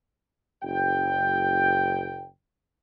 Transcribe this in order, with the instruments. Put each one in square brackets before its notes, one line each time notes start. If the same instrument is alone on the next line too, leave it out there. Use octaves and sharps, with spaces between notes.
[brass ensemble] F#1 G5